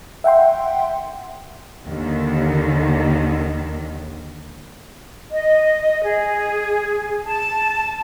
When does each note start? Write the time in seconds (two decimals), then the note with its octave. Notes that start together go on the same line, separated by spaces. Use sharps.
0.24 E5 F#5 G5 C6
1.86 D#2 D3 D#3
5.31 D#5
6.04 G#4
7.26 A5